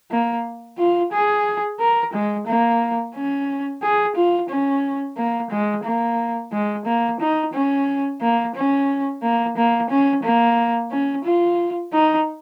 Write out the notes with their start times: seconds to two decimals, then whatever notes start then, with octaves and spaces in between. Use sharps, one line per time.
0.11 A#3
0.77 F4
1.12 G#4
1.80 A#4
2.13 G#3
2.46 A#3
3.15 C#4
3.82 G#4
4.16 F4
4.49 C#4
5.17 A#3
5.50 G#3
5.84 A#3
6.52 G#3
6.85 A#3
7.20 D#4
7.53 C#4
8.21 A#3
8.55 C#4
9.22 A#3
9.56 A#3
9.90 C#4
10.23 A#3
10.91 C#4
11.24 F4
11.93 D#4